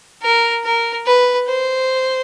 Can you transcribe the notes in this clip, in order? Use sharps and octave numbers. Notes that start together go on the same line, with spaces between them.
A#4
A#4
B4
C5